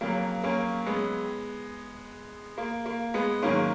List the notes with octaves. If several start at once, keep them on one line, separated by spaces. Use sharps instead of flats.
F2 C#3 F#3 A#3
A#3 C#4
G#3 B3
A#3
A#3
G#3 B3
G#2 D#3 F#3 A#3 C#4